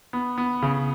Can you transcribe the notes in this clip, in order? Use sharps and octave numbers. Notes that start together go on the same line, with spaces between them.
B3
B3
C#3